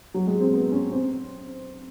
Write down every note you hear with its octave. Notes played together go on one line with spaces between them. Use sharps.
F#3
G#3
C4
B3
C#4
C4